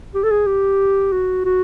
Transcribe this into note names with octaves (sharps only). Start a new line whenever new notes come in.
G4
A4
G#4
G4
F#4
F#4